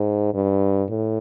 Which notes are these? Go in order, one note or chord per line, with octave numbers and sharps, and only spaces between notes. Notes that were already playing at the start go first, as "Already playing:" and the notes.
Already playing: G#2
G2
A2